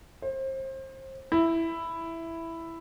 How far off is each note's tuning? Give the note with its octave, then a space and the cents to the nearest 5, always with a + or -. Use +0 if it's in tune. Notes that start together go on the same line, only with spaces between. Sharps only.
C5 +30
E4 +5